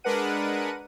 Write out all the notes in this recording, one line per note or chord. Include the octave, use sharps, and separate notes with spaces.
G#3 D4 A#4 B4 F#5 D#7